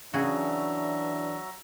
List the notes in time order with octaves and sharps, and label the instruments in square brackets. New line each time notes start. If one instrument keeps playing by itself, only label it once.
[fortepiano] C#3 [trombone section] E3 D4 [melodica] F#3 E5 A#5 [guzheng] F#4 G#4